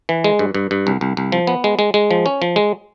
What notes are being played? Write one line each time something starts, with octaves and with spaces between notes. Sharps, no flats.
E3
G#3
G2
G2
G2
C2
C2
C2
F3
B3
G#3
G#3
G#3
F3
C#4
F3
G#3